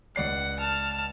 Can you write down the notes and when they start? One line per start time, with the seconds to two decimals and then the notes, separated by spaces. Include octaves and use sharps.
0.16 C#2 D5 F#5 C7
0.60 A5 F6